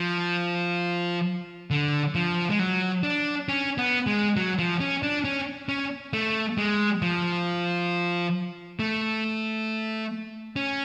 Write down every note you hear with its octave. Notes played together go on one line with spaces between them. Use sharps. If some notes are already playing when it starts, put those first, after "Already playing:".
Already playing: F3
D3
F3
G#3
F#3
D4
C#4
B3
G#3
F#3
F3
C#4
D4
C#4
C#4
A3
G#3
F3
A3
C#4